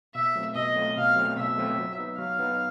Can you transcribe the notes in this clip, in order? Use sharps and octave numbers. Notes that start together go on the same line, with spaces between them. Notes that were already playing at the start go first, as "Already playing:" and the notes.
B2 E5
F#3 A3 C4 F4
B2 D#5
F#3 A3 C4 F4
B2 F5
F#3 A3 C4 F4
B2 E5
F#3 A3 C4 F4
F#3
B3 D#4
F#3 F5
B3 D#4